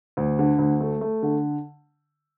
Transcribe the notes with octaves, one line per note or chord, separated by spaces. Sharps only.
D2
D3
D2
A3
A3
D3